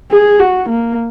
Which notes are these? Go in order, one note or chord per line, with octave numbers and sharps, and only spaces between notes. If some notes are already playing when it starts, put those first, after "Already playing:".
G#4
F#4
A#3